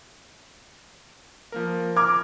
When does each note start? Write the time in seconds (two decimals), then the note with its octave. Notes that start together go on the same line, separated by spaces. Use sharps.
1.52 F3 A#3 A#4
1.96 A#5 D6 F6 G#6